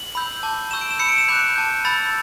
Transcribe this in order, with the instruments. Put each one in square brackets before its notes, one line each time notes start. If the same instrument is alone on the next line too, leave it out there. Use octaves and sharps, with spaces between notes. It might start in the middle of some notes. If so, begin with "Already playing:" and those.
Already playing: [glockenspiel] F#7
B5 E6 G6
A5 D6 G6
A5 C#6 E6 G6 E7
D7
E7
B5 E6 G6 C#7
D7
E7
B5 D6 F#6 G6
A5 D6 G6
B5 E6 G6 A6